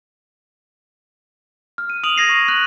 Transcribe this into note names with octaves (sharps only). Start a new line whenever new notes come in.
F6
D#7
D#6 D7 F7 F#7
D#6 G#6 A#6 C7 D#7
C#6
F#6 F#7